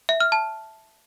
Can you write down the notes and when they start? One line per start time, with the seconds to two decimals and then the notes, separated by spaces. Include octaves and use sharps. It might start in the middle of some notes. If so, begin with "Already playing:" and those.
0.09 E5
0.20 F6
0.32 A5